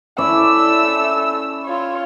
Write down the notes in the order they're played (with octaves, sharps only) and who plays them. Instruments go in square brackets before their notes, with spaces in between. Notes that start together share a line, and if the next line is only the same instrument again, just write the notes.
[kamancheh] A3 E6 [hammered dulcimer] C#4 E4 D5
[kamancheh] F4 C#5